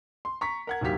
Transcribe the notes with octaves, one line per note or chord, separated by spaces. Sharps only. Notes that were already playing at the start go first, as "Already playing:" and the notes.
C6
A#5 C#6 B6
A#4 F#5 G#6
D1 G#2 F#3 A#3 G4 B6